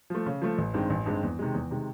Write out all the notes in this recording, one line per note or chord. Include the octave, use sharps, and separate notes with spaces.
F3 A3
C#3
F3 A3
A1
G2 D#3 G#3 C4
A1
G2 D#3 G#3 C4
E2
C3 D#3 G#3
E2
C3 D#3 G#3